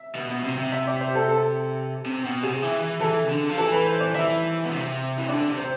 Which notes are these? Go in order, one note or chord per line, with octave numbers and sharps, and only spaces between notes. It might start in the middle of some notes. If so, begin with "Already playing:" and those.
Already playing: E5
B2
B2
C3
C3
E5
D5
C5
A4
A4
C3
B2
C3 G#4
E3
E3
E3 A4
C3
D3
F3
E3 A4
B4
C5
D5
E3 E5
B2
C3
E3
D3 D5
C3
C5